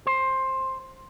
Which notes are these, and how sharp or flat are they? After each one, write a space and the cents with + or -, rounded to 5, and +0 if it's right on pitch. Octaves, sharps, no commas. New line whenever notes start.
C5 +15